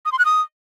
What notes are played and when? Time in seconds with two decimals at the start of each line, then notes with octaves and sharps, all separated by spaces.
0.05 D#6
0.12 C6
0.19 F#6
0.25 D#6